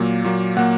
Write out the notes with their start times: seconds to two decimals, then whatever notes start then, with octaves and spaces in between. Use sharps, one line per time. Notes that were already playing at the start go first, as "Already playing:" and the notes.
Already playing: A#2 F#3 A#3
0.24 A#2 F#3 A#3
0.57 A#2 F#3 A#3 F#5